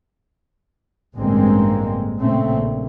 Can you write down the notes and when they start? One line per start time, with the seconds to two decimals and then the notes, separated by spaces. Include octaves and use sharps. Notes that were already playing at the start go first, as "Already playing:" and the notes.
1.16 A1 G2 D3 G#3 A#3 C4
2.19 A#2 C#3 A3 C4
2.52 A#1